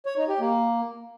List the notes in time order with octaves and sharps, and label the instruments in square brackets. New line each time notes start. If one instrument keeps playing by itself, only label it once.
[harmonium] C#5
D#4
G4
A#3